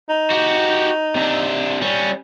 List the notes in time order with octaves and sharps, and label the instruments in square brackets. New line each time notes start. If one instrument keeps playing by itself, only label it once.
[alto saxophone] D#4
[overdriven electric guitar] F#4 G4
C3 D4
G3 C#4